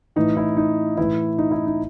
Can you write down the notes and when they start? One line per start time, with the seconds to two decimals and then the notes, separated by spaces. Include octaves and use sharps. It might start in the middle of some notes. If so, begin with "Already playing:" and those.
0.16 A2 E3 D#4
0.37 E4
0.57 D#4
0.98 A2 E3 E4
1.38 D#4
1.51 E4
1.66 D#4